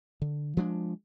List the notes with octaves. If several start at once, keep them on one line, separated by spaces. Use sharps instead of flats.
D3
F3 G#3 D4